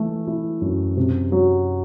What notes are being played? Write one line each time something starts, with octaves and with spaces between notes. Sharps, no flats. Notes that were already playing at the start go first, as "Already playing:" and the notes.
Already playing: E3 A3
E4
F#2
C3
F#3